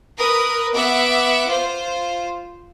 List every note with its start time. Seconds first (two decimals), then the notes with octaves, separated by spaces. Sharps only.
0.18 A#4 B4 D#6
0.74 B3 E5 F#5 D6
1.48 F4 C5